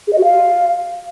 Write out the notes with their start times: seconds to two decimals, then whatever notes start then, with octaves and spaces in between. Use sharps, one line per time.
0.07 G#4
0.12 D#5
0.18 F#4
0.23 F5